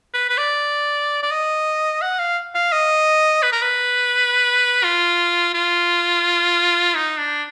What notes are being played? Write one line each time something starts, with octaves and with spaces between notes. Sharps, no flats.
B4
B4
D5
D5
D#5
F#5
F5
F5
D#5
B4
A#4
B4
F4
F4
D#4
D4